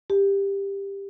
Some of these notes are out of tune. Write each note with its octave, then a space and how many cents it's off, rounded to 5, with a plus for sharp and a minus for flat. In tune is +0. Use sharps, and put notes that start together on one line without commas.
G4 +15